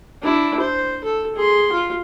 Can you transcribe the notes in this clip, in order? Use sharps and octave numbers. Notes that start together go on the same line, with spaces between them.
D4 E4
C5
A4
G#4 C6
F4